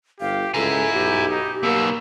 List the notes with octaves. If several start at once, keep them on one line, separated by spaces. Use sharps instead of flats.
G1 G4 F5
C#2 E4 A4 G#5 A#5
B1 G4
D#4
B1 B2 A#3 E6